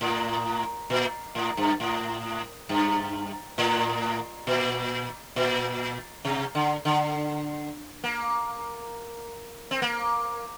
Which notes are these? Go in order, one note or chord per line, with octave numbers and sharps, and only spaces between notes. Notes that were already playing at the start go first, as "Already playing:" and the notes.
A2
A#2
A2
G2
A2
G2
A2
A#2
A#2
C3
D3
D3
A#3
C4
A#3